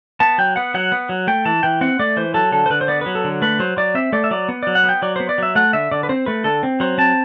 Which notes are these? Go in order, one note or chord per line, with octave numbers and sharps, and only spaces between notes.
B3 A5
F#3 G5
B3 F#5
F#3 F#5
B3
F#3
A3 G5
E3 A5
E3 G5
C4 F#5
A3 D5
E3 C5
F#3 A4
D3 A4
C5
D3 B4
C5
B3 D5
F#3 B4
A4
D3
A3 B4
F#3 C5
F#3 D5
C4 E5
A3 D5
E5
F#3 D5
B3
F#3 D5
F#5
B3 G5
F#3 D5
B3 C5
D5
F#3 E5
A3 F#5
D3 E5
D3 D5
B4
C4 C5
A3 B4
D3 A4
C4
F#3 C5
C4 A5